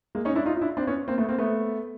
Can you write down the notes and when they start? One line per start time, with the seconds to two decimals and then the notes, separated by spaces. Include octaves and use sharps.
0.15 G#3 A#3
0.25 C#4 D#4
0.35 D4 E4
0.46 D#4 F4
0.56 F4
0.61 D4 E4
0.77 C4 D4
0.87 B3 C#4
1.08 A#3 C4
1.18 A3 B3
1.29 A#3 C4
1.39 A3 B3